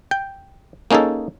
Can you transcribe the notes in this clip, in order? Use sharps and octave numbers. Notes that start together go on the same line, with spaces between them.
G5
A#3 C#4 D#4 G#4 A4